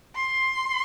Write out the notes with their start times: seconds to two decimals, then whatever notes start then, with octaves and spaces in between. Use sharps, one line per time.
0.16 C6